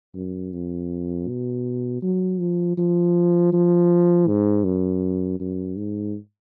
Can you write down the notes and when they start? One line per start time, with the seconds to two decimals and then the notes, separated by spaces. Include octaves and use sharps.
0.15 F#2
0.52 F2
1.28 B2
2.02 F#3
2.40 F3
2.77 F3
3.53 F3
4.27 G#2
4.65 F#2
5.40 F#2
5.77 G#2